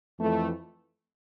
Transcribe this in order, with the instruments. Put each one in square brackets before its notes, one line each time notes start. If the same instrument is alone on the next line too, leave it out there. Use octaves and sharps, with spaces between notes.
[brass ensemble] F2 E3 A3